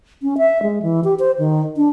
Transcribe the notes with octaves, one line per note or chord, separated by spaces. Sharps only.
C#4
E5
G#3
E3
G4
C5
D#3
D4